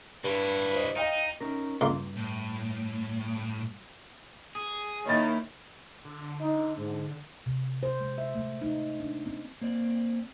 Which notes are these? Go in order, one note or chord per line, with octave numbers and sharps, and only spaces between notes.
G2 D3 E4
C5 D#5
D#4 D#5 F5 G5
C#4 D#4 A#4
C#2 G2 A#3 C6
A2
G#4
D#3 A#3 D#4 E4 C#5 A6
D3
D#4
G#2
C3
C5
G#3
E5
A3
D#4
D4
C4
A#3 C4 D5